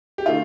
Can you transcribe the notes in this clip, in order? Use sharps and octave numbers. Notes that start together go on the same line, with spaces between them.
G4
D3 A3 F4